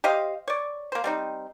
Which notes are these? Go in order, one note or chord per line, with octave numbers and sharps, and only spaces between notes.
G4 C5 D#5 F5
C#5 D5
A#3 C5
G3 C4 D#4